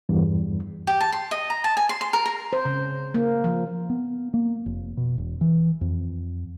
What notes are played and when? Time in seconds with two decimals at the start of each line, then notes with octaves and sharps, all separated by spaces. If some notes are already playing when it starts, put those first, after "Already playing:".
0.09 E2 G2
0.87 G4
1.01 A5
1.12 C6
1.31 D#5
1.50 A#5
1.64 A5
1.77 G#5
1.89 C6
2.01 C6
2.13 A#4
2.26 A#4
2.53 C5
2.65 C#3
3.14 A#3
3.44 F3
3.90 B3
4.34 A#3
4.66 F1
4.97 B2
5.18 E1
5.41 E3
5.81 F2